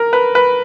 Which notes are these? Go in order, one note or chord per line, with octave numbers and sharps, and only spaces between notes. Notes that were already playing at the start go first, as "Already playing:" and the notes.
Already playing: A#4
B4
B4